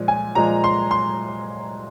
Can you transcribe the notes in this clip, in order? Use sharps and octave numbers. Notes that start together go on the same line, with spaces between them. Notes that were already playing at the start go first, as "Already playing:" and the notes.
Already playing: A#2 F3 G#3
G#5
A#2 F3 G#3 A#5
C6
C6